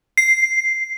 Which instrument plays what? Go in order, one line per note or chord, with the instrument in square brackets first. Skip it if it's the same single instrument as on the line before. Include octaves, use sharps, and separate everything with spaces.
[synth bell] C7